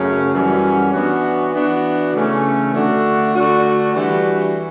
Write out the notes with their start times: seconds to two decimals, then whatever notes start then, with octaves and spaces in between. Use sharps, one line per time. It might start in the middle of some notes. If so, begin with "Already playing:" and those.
Already playing: F#2 C#3 F#3 A3 C#4
0.32 F#2 E3 G3 C#4 F#4
0.93 E3 B3 D4 F#4
1.53 E3 B3 D4 F#4
2.13 C#3 E3 A3 C#4
2.73 D3 A3 D4 F#4
3.33 D3 A3 D4 F#4
3.94 E3 G3 D4 F#4